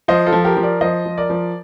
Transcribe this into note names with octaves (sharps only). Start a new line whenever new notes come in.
F3 C5 D#5
F4 A4
F3
G4 A#4
F3
A#4 D5
F3 C5 D#5
F3
A#4 D5
F3